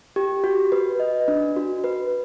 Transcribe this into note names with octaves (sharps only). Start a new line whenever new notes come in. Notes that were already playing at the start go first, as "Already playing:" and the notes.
G4
F#4
B4
D#5
D4
F#4
B4